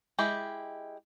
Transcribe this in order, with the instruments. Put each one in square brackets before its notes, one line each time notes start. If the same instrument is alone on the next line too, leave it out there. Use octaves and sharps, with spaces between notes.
[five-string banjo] G#3 E4 G4